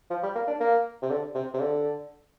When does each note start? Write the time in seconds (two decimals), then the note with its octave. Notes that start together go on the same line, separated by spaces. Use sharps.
0.11 F3
0.23 G3
0.35 A#3
0.48 D4
0.60 A#3
1.02 C3
1.10 D3
1.35 C3
1.54 C3
1.60 D3